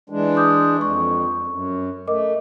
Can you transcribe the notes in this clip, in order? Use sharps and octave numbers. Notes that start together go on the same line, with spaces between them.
E3 G#3 D4
D6 D#6 G6
F2 C#6
F#2
A3 A#4 D#5 D6